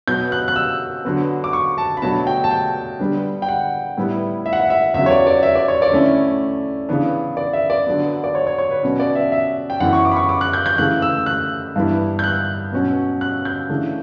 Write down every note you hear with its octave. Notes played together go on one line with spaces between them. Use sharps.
B2 F#3 B3 G6
F#6
F#6
E6
D3 F#3 B3
D6
C#6
A5
B5
B2 F#3 A3 D4 A5
G5
A5
G5
D3 G3 B3 D4
G5
F#5
A2 G3 B3 E4
E5
F#5
E5
E5
E2 C#3 F#3 E5
C#5
D5
D5
E5
D5
C#5
D5
D3 A3 C#4 E4
C#3 E3 B3 D4
D5
E5
D5
D3 F#3 B3
D5
C#5
C#5
C#5
B4
B2 F#3 C#4
D5
E5
E5
G5
F#2 E3 B3 E4 F#5
C#6
D6
B5
C#6
D6
F#6
G6
G6
C#3 E3 A3 F#6
E6
F#6
G2 E3 B3 E4
G6
F#6
B2 F#3 C#4
F#6
G6
C#3 E3 A3 D4